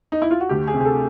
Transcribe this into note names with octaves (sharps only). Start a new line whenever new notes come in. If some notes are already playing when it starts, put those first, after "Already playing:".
D#4
E4
F4
F#4
D2 G4
G#4
C3
G#4
A4